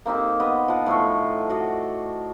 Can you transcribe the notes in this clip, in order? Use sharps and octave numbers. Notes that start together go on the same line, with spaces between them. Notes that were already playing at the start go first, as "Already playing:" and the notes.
A#3 C4 D#4 G4
B3 D#5
F3 F#5
A2 A4 C5 C#6
F#4 D5 D#5